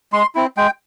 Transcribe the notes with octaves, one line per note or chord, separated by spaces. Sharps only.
G#3 C6
C4 E4
G#3 G5